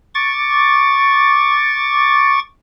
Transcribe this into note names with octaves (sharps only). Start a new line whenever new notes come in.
C#6 D6 A6